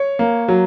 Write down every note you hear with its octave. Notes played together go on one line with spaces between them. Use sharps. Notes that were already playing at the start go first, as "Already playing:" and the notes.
Already playing: C#5
A#3
F#3